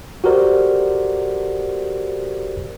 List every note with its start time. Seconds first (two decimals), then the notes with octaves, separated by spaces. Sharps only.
0.24 F#4 G4 A4 A#4 C5 D5